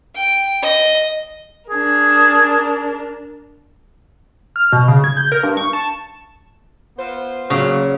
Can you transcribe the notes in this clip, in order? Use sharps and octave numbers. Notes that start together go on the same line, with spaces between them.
G5
D#5
D4 G#4 A#4
F6
B2
C#3
G#6
G6
A#4
G2
C#6
A5
B3 F4 C5
A#2 C#3 F#3